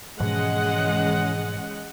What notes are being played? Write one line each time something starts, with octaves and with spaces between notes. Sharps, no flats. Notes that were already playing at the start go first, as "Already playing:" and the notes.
G#2 B2 E3 F3 G#3 C#4 D#5 F#5